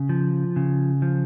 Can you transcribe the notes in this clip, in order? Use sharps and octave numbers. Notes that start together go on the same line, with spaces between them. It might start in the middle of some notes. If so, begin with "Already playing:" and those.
Already playing: C#3
F3
C#3
F3